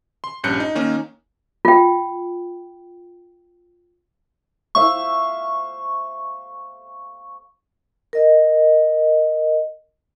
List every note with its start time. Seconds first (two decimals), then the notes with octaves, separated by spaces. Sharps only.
0.24 C6
0.44 A#1 G2 C#4 F#6 G6 C#7
0.60 D#4
0.75 D#3 A#3 C#4 D#4
1.65 F4 G5
4.75 C5 E5 F5 C#6
8.13 A#4 D#5